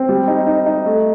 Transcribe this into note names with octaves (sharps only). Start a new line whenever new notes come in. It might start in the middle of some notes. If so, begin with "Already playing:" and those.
Already playing: C4
G3
D#4
D#4
D#4
A3